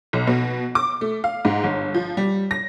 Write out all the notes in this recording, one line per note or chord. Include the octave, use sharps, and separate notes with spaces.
B1
B2
D6
A3
F5
G#2
G1
F3
G3
A#6